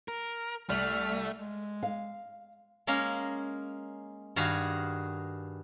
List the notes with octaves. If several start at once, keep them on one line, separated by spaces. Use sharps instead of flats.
A#4
C2 A3 F6 F#7
G#3
F5
G#3 A#3 C#4 A#4 F5
G2 D#3 F#4 G#4 F5 B5